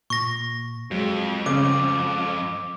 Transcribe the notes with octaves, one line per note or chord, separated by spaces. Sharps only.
A#2 C#6 A#6
F2 F#3 G#3
C#3 D6